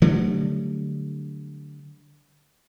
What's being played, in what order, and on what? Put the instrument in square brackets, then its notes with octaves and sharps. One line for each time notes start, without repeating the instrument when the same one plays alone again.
[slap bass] D3 F#3 G3 A3